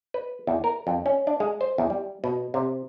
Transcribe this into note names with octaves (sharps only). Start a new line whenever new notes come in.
B4
E2
A#4
F2
C#4
D4
G#3
C5
E2
G3
B2
C3